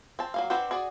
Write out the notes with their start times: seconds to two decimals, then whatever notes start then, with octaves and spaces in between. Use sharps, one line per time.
0.19 C4 A5
0.34 F#3 A#3 F5
0.50 C4 D4 B4 C5 F#5
0.71 F#4 G#4 D5